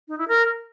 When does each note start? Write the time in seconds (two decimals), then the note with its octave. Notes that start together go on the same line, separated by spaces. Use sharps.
0.08 D#4
0.18 E4
0.28 A#4